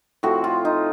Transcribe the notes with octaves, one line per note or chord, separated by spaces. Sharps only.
A2 F3 C4 F#4
F4
D#4